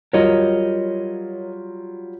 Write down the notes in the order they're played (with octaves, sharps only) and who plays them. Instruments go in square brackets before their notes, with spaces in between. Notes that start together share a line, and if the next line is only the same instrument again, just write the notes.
[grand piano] F#3 G3 F4 [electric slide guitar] A#4 C#5 D#5